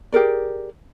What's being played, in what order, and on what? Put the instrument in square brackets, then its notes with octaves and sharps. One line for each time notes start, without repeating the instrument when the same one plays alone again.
[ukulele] G4 G#4 A#4 D5